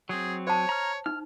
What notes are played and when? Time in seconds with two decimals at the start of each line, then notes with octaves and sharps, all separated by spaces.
0.09 F#3 C4 G#4
0.47 C5 C#5 A5
0.69 A#5 F6
1.06 D#4 F6